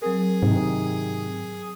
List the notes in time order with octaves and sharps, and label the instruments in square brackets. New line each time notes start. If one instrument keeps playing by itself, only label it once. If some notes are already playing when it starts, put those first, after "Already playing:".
[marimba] F#3 C4 A#4 [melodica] G#4
[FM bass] G#2 [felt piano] C3 D#3